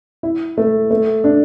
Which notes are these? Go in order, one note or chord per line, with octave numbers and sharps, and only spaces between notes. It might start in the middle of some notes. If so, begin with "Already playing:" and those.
E4
A3
A3
D4